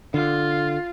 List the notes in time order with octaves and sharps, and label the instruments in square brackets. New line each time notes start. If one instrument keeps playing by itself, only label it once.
[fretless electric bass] D3 [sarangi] F4